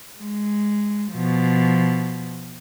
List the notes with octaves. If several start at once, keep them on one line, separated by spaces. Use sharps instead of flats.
G#3
B2 F3